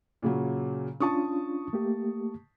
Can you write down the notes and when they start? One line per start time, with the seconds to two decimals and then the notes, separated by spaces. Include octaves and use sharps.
0.22 A#2 C#3 F#3
1.00 C#4 D4 F4 A5 C#6 D#6
1.73 A3 A#3 G4